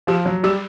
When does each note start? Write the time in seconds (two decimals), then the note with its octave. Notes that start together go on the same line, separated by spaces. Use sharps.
0.07 F3 G4
0.25 F#3
0.43 G3 G4